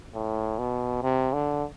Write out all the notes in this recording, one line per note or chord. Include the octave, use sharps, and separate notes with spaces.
A2
B2
C3
D3